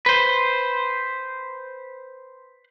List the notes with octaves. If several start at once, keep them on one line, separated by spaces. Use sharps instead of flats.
B4 C5